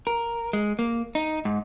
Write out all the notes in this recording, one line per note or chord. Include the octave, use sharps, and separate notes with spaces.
A#4
G#3
A#3
D#4
G#2